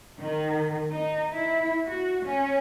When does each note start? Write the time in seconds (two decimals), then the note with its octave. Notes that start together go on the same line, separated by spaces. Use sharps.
0.19 D#3
0.92 D#4
1.32 E4
1.86 F#4
2.23 C#4